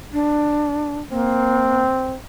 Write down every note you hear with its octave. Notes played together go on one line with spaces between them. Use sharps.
D4
A#3 C4